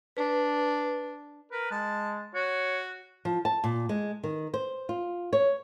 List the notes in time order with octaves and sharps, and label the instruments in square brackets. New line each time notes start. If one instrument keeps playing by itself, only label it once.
[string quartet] D4 [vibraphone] B4
[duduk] A#4 [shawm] B4
[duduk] G#3 [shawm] A5
[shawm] F#4 [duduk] C#5
[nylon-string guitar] F3
A5
A#2
G#3
D#3
C5
F4
C#5